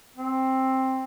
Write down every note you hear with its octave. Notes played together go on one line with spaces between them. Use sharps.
C4